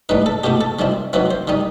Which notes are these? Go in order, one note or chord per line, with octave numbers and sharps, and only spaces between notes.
A2 G3 D#4 B4
A4
B2 A3 E4 G4
A4
D#3 G3 C4 E4
D#3 F#3 C4 E4 B4
C5
D#3 G3 D#4